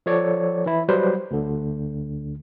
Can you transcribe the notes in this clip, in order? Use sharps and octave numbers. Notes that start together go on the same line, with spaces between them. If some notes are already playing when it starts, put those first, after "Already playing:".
F3 A4 C#5 D5
E3 E4
F#3 G3 B4 C5
D2 D3